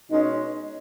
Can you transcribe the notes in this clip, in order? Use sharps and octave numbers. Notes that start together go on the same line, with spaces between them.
B2 G#3 C#4 D#4